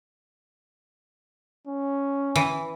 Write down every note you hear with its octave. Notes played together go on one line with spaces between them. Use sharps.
C#4
E3